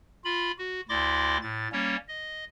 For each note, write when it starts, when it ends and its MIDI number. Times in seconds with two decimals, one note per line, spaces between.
0.24 0.51 65
0.24 0.51 83
0.58 0.81 66
0.89 1.38 38
0.89 1.38 64
0.89 1.38 74
0.89 1.38 84
0.89 1.38 86
0.89 1.38 94
1.42 1.68 45
1.42 1.68 93
1.72 1.96 55
1.72 1.96 58
1.72 1.96 61
1.72 1.96 73
2.08 2.45 75